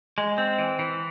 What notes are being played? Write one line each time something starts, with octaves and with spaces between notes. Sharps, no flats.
G#3
C4
E3
E3